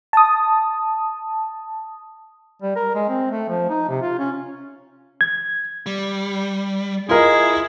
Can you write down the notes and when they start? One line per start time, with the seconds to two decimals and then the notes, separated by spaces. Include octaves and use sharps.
0.13 A5 D#6
2.62 G3
2.76 A#4
2.95 G#3
3.09 C4
3.31 A3
3.48 F3
3.69 D#4
3.88 C3
4.02 F4
4.19 C#4
5.21 G#6
5.86 G3
7.09 E4 F4 G#4 A#4 D#5